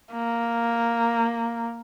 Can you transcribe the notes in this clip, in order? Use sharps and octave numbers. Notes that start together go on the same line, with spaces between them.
A#3